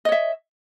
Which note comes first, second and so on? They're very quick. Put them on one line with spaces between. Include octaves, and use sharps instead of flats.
D#5 C#5 E5